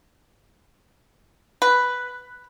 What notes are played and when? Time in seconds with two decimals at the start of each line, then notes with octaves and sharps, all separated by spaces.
1.62 B4